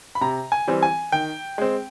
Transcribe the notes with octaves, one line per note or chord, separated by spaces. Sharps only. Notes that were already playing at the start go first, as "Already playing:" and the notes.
B5
C3 A#5
G#5
E3 G3 C4
G#5
D#3 G5
G#3 C4